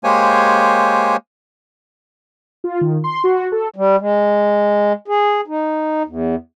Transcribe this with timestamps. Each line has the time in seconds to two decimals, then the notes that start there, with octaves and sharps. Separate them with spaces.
0.04 G#3 A#3 G4 C5 C#5 G#5
2.64 F4
2.81 D#3
3.04 C6
3.24 F#4
3.52 A4
3.76 G3
4.00 G#3
5.08 G#4
5.47 D#4
6.06 E2